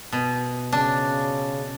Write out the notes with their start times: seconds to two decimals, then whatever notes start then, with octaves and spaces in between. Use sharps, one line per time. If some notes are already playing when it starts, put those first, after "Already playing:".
0.12 B2
0.72 C#3 D4